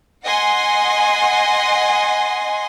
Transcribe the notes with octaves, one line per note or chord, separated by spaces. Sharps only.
D#5 F#5 G#5 C6